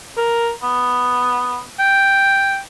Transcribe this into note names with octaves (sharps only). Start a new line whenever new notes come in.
A#4
B3
G5